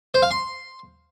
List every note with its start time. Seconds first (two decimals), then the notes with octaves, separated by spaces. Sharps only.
0.14 C5
0.22 F5
0.31 C6